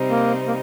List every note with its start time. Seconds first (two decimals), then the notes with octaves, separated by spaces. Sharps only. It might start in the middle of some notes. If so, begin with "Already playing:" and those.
Already playing: C3 G3 C4 D#4
0.10 A#3
0.47 A#3